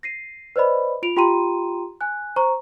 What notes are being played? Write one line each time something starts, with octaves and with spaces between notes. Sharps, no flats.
A#6 C7 D#7
B4 C5 D5 D#5 B5
F4 D7 F7
F4 G4 G5 A#5 C6 D#7
G#5 F#6
C5 A#5 C#6